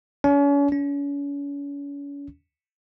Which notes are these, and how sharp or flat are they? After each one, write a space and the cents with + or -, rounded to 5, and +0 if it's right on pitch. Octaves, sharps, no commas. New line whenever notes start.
C#4 +40
C#4 +40